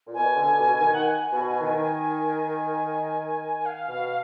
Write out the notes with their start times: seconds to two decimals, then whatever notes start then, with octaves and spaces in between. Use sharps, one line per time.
0.06 A#2
0.14 B2 G#5
0.36 D3
0.59 B2
0.80 D#3
0.94 F#5
1.02 G#5
1.31 B2
1.61 D#3
3.66 F5
3.88 B2